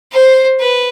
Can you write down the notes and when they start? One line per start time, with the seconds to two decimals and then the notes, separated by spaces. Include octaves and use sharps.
0.12 C5
0.60 B4